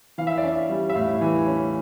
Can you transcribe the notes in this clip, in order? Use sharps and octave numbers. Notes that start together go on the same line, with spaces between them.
E3 F5
E5
D5
C#4 E5
G3
E5
A2 F5
E3
C#4